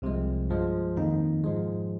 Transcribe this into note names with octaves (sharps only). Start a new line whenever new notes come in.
C2 C3 F3 G#3
G2 F3 G#3
F2 D#3 A#3 D#4
G#2 F3 G#3